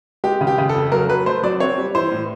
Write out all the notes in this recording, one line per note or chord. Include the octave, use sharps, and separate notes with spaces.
G#3 G4
C#3
G4
C#3
A4
F2
F#3 A#4
F#3 B4
A3 C5
F#3 D5
C4 C#5
G3
E3 C5
A2